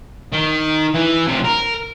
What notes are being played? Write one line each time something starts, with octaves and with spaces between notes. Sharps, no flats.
D#3
E3
C3 F3
A#4